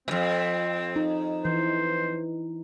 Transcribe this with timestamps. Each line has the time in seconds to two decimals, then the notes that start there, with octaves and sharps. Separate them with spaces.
0.08 F2 B2 C4
0.96 D#4
1.45 E3 C5